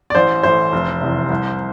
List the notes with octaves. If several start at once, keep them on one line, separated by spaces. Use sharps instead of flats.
D5
A1 C5
A2 E3 C5
F1
E2 C3
C2